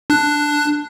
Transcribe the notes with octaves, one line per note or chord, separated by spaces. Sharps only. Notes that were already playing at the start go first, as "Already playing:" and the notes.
D4 F#6